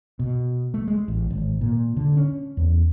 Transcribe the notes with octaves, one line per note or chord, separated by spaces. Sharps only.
B2
A3
G#3
A1
G#1
A#2
D3
C#4
E2